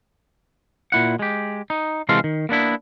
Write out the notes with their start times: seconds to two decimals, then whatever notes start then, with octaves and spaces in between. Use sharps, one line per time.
0.92 A#2 E4 F#5
1.19 G#3 G4
1.70 D#4
2.09 C3 E3 G#3 A4 F5 C6
2.24 D#3
2.49 A#3 B3 D4 E4